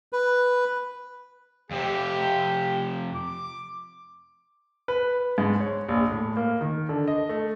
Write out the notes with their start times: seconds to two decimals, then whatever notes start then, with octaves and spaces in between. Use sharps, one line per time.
0.13 B4
1.71 F2 C3 G4
3.15 D6
4.88 B4
5.38 G#2
5.60 C#5
5.88 A#1
6.11 A2
6.37 A#3
6.61 D#3
6.89 D3
7.08 D#5
7.29 A3